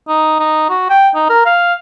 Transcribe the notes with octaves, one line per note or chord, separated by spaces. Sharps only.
D#4
D#4
F#4
G5
D#4
A#4
F5